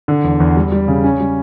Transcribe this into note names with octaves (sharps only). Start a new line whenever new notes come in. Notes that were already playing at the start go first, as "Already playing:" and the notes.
D3
E2
E2
G3
G3
C#3
C#4
G3